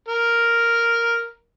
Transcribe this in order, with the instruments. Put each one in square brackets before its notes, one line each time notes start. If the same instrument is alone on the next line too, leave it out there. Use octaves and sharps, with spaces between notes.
[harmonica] A#4